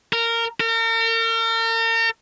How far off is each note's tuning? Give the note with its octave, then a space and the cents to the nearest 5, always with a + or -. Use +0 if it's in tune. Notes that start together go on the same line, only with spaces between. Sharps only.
A#4 -15
A#4 -40